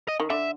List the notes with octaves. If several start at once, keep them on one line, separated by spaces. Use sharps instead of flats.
D#5
D#3
D3 E5